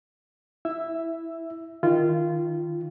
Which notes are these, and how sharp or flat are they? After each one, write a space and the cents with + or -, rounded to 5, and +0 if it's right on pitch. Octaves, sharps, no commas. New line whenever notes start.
E4 -5 E5 +0 E6 +10
D#3 +0 F4 -20